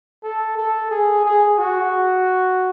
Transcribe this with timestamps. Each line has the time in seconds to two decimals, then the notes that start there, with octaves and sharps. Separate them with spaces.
0.23 A4
0.57 A4
0.91 G#4
1.25 G#4
1.58 F#4